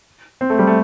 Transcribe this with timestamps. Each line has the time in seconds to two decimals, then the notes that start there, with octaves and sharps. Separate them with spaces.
0.41 C4
0.50 A3
0.59 G3
0.67 A3